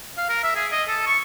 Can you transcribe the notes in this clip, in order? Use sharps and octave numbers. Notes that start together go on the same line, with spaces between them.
F5
A#4
E5
G#4
D#5
A4
C#6